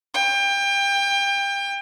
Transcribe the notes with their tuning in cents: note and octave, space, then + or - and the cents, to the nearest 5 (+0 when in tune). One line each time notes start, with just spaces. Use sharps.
G5 +30